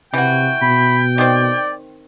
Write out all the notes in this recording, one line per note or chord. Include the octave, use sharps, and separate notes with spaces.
C3 E3 F#4 G5
B2 B5
D#3 C4 D5